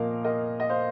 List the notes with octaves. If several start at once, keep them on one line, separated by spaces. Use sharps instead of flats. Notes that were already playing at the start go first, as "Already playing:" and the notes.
Already playing: A#2 F3 A#3 A#4 D#5 F5
A#4 D#5
D#5
C5 F5